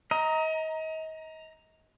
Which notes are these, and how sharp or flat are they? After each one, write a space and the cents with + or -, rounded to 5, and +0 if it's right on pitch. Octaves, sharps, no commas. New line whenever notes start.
D#5 +30 A#5 +0